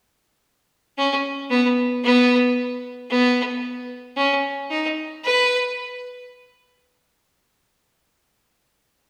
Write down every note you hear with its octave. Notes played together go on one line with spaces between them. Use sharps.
C#4
B3
B3
B3
C#4
D#4
B4